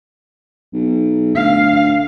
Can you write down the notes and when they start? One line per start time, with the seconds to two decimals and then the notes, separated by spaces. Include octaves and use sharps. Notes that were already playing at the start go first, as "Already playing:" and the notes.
0.73 B1
1.35 D2 F5